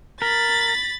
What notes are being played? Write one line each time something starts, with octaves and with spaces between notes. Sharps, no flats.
A#4 B5 A6